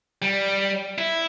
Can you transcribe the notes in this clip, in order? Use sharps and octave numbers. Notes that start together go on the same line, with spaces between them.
G3
E4